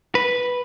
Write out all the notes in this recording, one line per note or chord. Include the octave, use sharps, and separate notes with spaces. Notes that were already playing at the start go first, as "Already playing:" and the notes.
B4